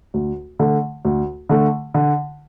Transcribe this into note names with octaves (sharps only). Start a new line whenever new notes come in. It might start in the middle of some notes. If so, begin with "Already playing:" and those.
D2
D3 A3
D2
D3 A3
D3